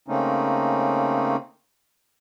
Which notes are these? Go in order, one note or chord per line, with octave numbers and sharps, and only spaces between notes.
C#3 A3 A#3 C4 C#4 D#4